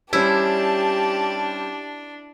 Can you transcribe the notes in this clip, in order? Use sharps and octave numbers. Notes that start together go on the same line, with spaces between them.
G3 C#4 D4 E4 G4 C5 A5